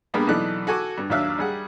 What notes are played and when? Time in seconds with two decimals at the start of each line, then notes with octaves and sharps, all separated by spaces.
0.14 G3 A#3 B3 D4 G#4
0.28 B1 E3 D#4 A4 D5 F#6
0.67 F#4 A4 G#5 C#6 D6
0.98 G2
1.10 D#2 F#3 D4 E5 F5 F#6
1.38 G3 G#4 F#5